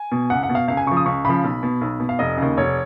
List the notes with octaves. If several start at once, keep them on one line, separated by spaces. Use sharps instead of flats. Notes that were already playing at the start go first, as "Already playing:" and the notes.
Already playing: G#5
B2
C#2 F#5
F#5
B2
F5
C#2 F5
G#5
C#3 F3 C#6
D#6
C#2 C#6
C#3 F3 B5
B1
B2
B1
B2
F5
F1 D#5
D#2 C#3
F1 C#5